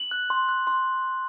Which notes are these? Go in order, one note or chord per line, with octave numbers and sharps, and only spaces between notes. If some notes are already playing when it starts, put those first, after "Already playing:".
Already playing: F#7
F#6
C6
F#6
C6